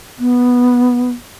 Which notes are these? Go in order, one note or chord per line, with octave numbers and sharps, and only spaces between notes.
B3